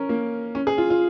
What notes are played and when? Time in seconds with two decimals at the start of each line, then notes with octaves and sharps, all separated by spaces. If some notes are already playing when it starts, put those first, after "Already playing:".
Already playing: C#4 A#4
0.09 A#3
0.55 C#4
0.67 G#4
0.78 F4
0.90 F4